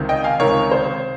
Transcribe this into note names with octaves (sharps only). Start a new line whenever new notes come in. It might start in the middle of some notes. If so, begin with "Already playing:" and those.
Already playing: C#2 C3 D#3
D#5 G5
F5 G#5
C#2 C3 D#3 A#4 C#5
C5